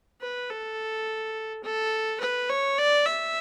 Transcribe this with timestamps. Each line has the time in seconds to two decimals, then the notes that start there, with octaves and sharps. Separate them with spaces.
0.22 B4
0.50 A4
1.64 A4
2.21 B4
2.50 C#5
2.78 D5
3.06 E5